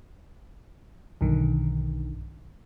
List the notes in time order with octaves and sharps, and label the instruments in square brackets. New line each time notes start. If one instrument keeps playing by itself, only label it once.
[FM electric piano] B1 G2 D3 D#3